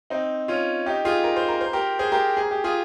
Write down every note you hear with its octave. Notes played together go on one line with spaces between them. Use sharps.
C4 D#4
C#4 F4
D#4 G4
F4 G#4
A#4
C5
A#4
C5
G4 A#4
G#4 C5
G4 A#4
G#4
G4
F4 G#4